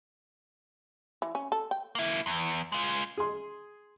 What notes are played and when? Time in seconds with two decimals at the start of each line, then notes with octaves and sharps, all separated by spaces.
1.22 E3
1.35 C#4
1.52 A4
1.71 G5
1.95 A#3 E4
2.26 E2
2.72 G#3 F4
3.18 G#4 C6